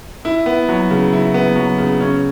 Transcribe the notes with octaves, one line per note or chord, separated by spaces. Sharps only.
E4
B3
F#3
C#3
E4
B3
F#3
C#3
C#4